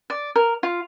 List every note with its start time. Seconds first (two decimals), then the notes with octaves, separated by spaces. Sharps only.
0.10 D5
0.36 A#4
0.63 F4